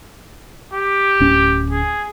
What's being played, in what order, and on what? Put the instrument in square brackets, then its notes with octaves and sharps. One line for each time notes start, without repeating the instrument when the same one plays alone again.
[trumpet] G4
[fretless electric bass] D1 C#4
[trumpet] G#4